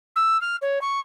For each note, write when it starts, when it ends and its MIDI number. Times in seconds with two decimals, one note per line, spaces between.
0.16 0.39 88
0.41 0.56 89
0.62 0.81 73
0.81 1.00 85